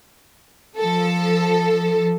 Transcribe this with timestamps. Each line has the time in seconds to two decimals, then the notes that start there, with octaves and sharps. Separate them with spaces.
0.77 F3 A4